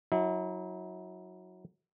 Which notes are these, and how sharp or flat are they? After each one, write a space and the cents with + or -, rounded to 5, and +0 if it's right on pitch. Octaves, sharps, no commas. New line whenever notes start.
F#3 -10 E4 -45